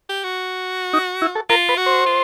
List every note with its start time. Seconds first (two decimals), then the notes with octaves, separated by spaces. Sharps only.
0.09 G4
0.23 F#4
0.93 D#4
1.22 E4
1.35 A4
1.49 F4 A#4
1.69 B4
1.77 F#4
1.86 C5
2.06 F4